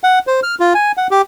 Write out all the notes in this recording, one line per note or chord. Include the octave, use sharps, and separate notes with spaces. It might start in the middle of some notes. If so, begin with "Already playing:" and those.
F#5
C5
F6
F4
G#5
F#5
G4